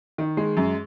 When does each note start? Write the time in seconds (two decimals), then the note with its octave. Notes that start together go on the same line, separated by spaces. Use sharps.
0.18 D#3
0.37 G#3
0.57 F#2